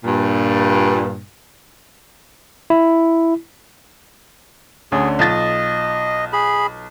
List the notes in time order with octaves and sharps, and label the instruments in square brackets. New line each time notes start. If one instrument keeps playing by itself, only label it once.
[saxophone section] G2 A#2
[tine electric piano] E4
[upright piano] D2 D3 C#4 [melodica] G#4
[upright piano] B1 F4 A6 [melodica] D#5
[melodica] G#4 B5